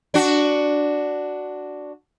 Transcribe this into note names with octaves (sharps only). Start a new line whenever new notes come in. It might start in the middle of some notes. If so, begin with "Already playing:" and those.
D4 F#4